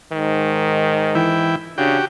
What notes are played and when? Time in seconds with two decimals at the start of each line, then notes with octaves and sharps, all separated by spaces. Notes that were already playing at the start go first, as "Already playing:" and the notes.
0.12 G#2 D#3
1.15 E3 E4 G5
1.78 C#3 D4 F#4 G4 G5